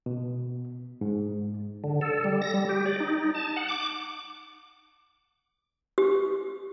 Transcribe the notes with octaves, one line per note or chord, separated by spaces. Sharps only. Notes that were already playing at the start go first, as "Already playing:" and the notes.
B2
G#2
D3
A4
G3
A#6
G3
G4
D5
D#4
A5
F#5
D6
G4